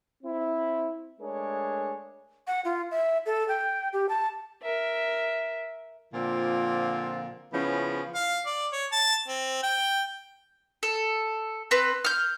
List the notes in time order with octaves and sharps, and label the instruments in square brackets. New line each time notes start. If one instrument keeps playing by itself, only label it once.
[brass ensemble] C4 E4
G#3 A3 D4 G#4 A#4 C#5
[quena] F#5
F4
E5
A4
G5
G4
A5
[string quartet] A#4 E5
[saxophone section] A#2 D3 F3 C4 F4
C#3 F3 B3 C#4 E4 F4
[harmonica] F5
D5
C#5
A5
C4
G5
[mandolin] A4
C4 B4
F6 G6